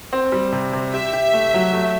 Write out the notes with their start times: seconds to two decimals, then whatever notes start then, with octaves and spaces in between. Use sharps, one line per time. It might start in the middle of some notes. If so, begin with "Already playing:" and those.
0.13 C4
0.32 G3
0.52 C3
0.73 C3
0.93 G4 E5
1.13 G4
1.33 A3
1.54 F#3
1.73 A3